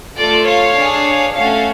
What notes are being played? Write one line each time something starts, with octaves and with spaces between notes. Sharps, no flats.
A3 F4 A4 D5
C#5 F5
D4 G#4
A3 C#4 F#4 A4 C#5 F5